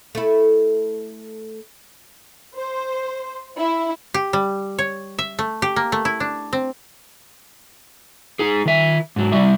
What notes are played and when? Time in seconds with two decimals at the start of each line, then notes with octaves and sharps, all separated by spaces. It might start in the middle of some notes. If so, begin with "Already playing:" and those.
0.15 A3 E4
2.56 C5
3.58 E4
4.14 G4
4.33 G3
4.79 C#5
5.19 E5
5.39 A3
5.62 G4
5.76 A#3
5.92 A3
6.05 E4
6.20 D4
6.53 C4
8.39 D#4 G#4
8.66 D#3 E5
9.16 G#2 F#3
9.32 C3 G3 E5